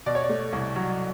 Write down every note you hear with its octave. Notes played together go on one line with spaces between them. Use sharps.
B2 D5
C#5
D5
A3
C2
F#3